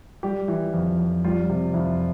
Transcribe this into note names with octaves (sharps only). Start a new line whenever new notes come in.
G3 G4
E3
F2
F2
G3 F4
C3
F2 E4